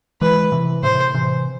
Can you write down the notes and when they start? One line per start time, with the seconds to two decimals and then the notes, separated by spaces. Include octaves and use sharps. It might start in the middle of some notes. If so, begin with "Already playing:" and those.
0.21 E3 G#3 B4
0.52 C3 E3
0.83 A2 C3 C5
1.14 C3 E3